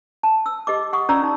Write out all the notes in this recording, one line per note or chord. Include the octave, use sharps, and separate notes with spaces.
A5
E6
G4 D#5 D6
F#5 C#6 D#6
C#4 F4 D5 A#5 E6
C#4 D#4